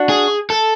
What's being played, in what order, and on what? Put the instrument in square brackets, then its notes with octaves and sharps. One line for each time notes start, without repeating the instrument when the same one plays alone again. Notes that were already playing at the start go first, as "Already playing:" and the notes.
Already playing: [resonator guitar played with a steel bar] D4 F#4
[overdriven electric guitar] G#4
A4